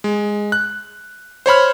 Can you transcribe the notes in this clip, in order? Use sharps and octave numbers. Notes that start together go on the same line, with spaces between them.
G#3
F#6
C5 C#5 B5 F6